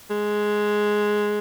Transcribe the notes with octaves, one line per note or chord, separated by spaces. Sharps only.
G#3